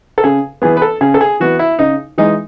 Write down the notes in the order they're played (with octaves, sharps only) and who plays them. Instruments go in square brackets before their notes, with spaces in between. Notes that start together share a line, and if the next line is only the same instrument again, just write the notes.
[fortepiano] A4
[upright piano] C#3 [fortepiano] G#4
[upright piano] E3 B3 [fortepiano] G#4
[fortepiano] B4
A4
[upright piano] C#3 [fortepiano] G#4
[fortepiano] A4
G#4
[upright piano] E3 B3 [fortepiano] F#4
[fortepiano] E4
[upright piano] C#3 [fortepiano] D#4
[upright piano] E3 G#3 [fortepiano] D#4